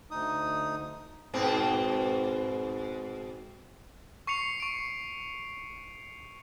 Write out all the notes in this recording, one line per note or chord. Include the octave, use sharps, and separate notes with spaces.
D2 D#4 D#6
G#2 B2 C4
C#6 C7 C#7 F7
C#6 D7